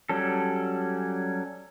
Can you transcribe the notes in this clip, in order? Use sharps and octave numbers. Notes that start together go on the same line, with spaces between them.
F#3 G3 C#4 A4